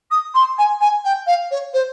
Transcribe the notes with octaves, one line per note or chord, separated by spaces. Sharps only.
D#6
C6
G#5
G#5
G5
F5
C#5
C5